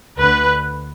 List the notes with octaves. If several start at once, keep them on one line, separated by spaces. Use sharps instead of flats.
D2 D3 B4